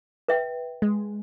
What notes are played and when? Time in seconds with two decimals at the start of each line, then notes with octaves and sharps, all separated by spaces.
0.28 B4 E5 G5
0.82 G#3